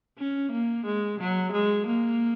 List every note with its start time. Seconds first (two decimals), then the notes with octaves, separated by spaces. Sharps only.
0.19 C#4
0.52 A#3
0.86 G#3
1.20 F#3
1.52 G#3
1.87 A#3